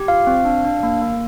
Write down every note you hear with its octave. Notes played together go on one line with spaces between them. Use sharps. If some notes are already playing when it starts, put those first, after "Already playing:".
Already playing: G4
F4 F5
C4
D4
D4
A#3
A#3